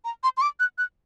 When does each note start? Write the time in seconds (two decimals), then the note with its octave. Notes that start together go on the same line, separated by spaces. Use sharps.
0.05 A#5
0.24 C6
0.37 C6
0.42 D6
0.60 F#6
0.78 F#6